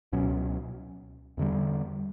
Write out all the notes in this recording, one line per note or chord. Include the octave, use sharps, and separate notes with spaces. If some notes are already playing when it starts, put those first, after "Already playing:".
C#2 B2 F#3 C#4
E2 D3 G3